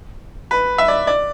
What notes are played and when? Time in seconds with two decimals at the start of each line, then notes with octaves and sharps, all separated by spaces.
0.51 B4
0.78 E5
0.88 D5
1.07 D5